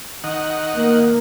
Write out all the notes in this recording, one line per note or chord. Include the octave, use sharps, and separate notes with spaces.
D#3 D#5 F#5
A#3